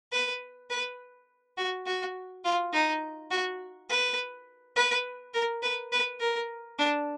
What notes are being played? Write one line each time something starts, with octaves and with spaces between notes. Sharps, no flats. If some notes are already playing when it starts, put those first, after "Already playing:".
B4
B4
F#4
F#4
F4
D#4
F#4
B4
B4
A#4
B4
B4
A#4
D4